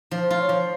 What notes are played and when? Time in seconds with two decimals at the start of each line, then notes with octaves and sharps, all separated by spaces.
0.11 F3 C5
0.30 F4
0.39 C#5
0.49 F3